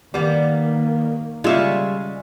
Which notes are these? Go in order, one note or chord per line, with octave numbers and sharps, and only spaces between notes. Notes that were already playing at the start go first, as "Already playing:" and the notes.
D#3 G3 A#3 B3
C#3 G3 G#3 F4 E5 C#6